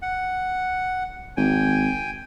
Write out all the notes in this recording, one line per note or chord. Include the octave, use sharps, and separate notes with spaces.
F#5
G#1 G5 G#5